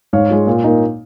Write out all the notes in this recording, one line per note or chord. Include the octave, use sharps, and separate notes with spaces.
G#2 C#5 F5
G#3 F4
A#2
A#3 D#4